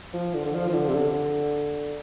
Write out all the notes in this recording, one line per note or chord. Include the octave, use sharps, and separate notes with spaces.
F3
D3
D3
F3
F3
D3
C3
D3